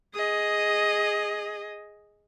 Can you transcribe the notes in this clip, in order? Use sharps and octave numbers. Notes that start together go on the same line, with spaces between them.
G#4 D#5